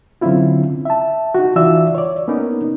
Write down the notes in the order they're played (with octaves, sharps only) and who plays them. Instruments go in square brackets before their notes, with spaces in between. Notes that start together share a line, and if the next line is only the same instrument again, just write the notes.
[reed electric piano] D3 F#3 C4 C#4 E4 F4
E5 A5
D#4 F#4
E3 F4 F#4 D5 E5 E6
C#5 D5
A#3 B3 C#4 D#4 A#4